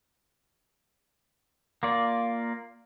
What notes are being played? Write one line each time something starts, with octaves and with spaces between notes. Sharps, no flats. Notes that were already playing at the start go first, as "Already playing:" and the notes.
A#3 F4 D5